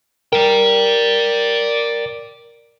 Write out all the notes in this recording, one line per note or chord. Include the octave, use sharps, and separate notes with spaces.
A#4 D5 G5